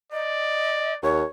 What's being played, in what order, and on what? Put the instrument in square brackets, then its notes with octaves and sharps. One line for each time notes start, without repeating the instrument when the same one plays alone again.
[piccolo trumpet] D5 [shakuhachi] D#5
[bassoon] D#2 [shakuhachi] C#5